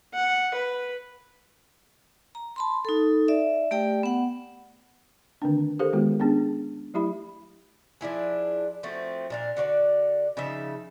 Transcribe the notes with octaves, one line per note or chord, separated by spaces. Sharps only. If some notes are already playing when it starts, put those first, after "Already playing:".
F#5
B4
A#5
A5 B5 C6
D#4 A4
D5 E5
A3 G4 D5 G5
B3 F#5
D3 D#3 A3 C4 D4
G4 A4 A#4 C5 F5
D#3 G#3 B3 F4 F#4
B3 C#4 D4 G#4
F#3 A3 E4 G4 E5 B5
F3 D4 E4 G#4
F3 A3 C4 F#4
A#2 D4 F5
D3 F#4 C5 D5
C#3 F3 D#4 E5